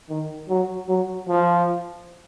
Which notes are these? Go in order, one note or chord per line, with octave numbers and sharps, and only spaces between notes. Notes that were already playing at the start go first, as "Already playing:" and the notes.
D#3
F#3
F#3
F3